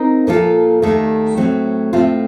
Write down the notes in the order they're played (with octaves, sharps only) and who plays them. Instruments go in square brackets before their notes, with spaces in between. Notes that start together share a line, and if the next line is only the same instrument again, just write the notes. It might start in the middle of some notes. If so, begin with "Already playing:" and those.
Already playing: [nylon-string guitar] C4 D#4 A#4
A#2 F3 A#3 F4 A4
D#2 D#3 A3
A2 F#3 A3 C4
A2 A3 C4 F4